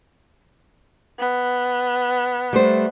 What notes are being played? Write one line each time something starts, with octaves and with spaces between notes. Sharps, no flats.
B3
G3 A3 C5